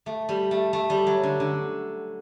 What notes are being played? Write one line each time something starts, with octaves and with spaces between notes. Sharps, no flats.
A3
G3
A3
A3
G3
F#3
D3
D3